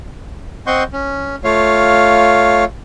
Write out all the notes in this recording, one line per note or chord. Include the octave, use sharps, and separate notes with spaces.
C4 D#5 F#5 C6 C#6 G6
C#4
A3 F4 C#5 F5